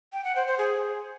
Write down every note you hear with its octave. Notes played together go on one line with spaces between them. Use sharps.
G5
F#5
C5
C5
G#4